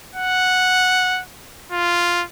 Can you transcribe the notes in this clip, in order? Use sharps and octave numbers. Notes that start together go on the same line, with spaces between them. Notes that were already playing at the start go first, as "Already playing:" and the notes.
F#5
F4